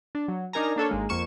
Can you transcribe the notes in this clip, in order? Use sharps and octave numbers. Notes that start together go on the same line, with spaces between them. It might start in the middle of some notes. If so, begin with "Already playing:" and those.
D4
F#3
D4 D#4 A#4 G#5 A#5
A#3 D4 A4 C#5
G#1 G#3 A#3
F2 A#3 C#6 E7